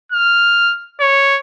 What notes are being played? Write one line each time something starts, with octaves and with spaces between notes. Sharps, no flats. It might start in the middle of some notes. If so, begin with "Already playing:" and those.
F6
C#5